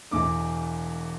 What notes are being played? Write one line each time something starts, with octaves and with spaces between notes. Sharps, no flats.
E1 E2 E3 D6